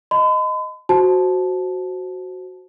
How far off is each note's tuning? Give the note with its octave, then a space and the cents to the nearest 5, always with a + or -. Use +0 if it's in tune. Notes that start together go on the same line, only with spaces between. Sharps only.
D#5 +0 B5 +45
F#4 +0 C5 +0 A5 -15